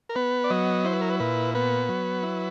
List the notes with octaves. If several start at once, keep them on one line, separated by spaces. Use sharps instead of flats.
A#4
B3 B4
D5
F#3 D#5
E4 C5
B4
A#4
B4
A#2 B4
B3 B4
F#3
E4